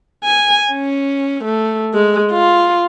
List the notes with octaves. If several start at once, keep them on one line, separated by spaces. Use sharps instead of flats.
G#5
C#4
A3
G#3
F4